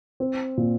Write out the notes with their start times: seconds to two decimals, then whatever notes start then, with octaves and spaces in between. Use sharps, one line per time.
0.20 C4
0.57 A#2